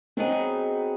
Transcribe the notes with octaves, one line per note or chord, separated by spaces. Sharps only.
F#3 B3 C4 D#4 G#4